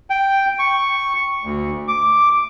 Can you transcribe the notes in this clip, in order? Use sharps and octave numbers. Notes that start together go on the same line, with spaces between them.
G5
C#6
D2
D6